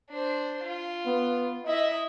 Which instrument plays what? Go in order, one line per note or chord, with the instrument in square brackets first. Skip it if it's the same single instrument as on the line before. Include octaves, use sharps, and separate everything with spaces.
[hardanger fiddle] D4 C5
F4
[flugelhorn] B3
[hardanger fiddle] E4 E5 [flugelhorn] D#5